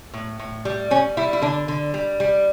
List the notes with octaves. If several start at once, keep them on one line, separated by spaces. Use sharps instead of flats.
A2
A2
G3
G3 C#4
G3 E4
E4
D3 D4
D3
G3
G3